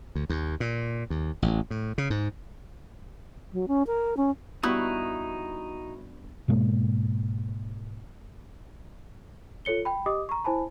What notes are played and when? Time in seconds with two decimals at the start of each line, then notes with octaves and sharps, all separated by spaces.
0.15 D2
0.30 D#2
0.60 A#2
1.10 D#2
1.42 A1
1.71 A2
1.98 C#3
2.10 G#2
3.53 F#3
3.68 C#4
3.87 A#4
4.17 C#4
4.63 G2 B3 D#4 E4 F#4 C#6 D#6 F#6
6.48 G#2 B2 G#3 A#3
9.65 F4 A4 C#5 C#7 G7
9.85 G5 B5
10.06 G4 D#5 D6 D#6
10.29 A#5 C#6
10.44 E4 C5 G#5 A5 B5